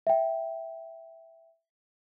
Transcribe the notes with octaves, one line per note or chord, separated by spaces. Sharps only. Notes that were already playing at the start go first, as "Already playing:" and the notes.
E5 G5